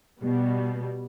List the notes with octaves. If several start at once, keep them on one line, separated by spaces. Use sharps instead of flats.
B2 G3 B3